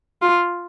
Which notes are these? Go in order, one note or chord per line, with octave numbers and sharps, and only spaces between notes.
F4